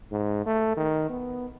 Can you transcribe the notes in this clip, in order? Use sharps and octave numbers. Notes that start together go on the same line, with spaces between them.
G#2
A3
D#3
B3